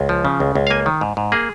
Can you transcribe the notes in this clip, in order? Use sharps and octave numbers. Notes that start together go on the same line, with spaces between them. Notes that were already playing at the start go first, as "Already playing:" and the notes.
Already playing: C#2
F3
C#3
C#2
C#2
F5
A#3 G#5
D#3
G#2
G#2
A#3 G#4